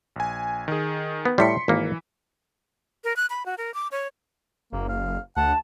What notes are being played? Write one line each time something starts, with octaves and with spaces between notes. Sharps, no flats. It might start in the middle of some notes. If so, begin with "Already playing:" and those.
A#1 G#5
D#3 G#4
B3
A2 G3 C6 B6 C#7
G#1 E3 A#3
A#4
F#6
B5
F#4
A#4
D6
C#5
F#1 A#3
F5
D2 F#5 A5